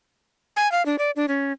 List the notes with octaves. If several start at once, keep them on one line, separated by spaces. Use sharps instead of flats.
G#5
F5
D4
D5
D4
C#4